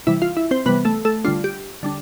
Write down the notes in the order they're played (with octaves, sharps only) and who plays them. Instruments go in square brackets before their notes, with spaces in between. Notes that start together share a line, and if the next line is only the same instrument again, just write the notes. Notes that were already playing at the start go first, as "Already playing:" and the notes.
[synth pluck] C3 E3 G3 E4 E5
F4 F5
E4 E5
C4 C5
C3 E3 G3 B3 B4
A3 A4
A3 A4
D3 G3 D4 F4
G4
D3 G3 D4